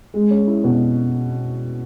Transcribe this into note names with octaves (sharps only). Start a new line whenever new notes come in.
G#3
C#4
E4
B2